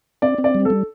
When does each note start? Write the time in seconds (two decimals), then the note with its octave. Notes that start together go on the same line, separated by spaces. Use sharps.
0.22 C4 D5
0.38 C4
0.44 D5
0.55 G3
0.65 G3 A4